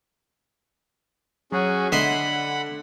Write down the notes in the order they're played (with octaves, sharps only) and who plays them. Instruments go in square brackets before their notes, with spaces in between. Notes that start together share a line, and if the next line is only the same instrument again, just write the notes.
[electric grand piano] F#3 [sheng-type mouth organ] C#4 F#4 G#4
[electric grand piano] D3 [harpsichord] D#5 E5 C6 [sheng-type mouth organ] F#5 B5